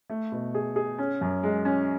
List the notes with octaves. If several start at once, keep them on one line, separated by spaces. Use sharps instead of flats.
A3
B2
G#4
G#4
C#4
F#2
G#3
C#4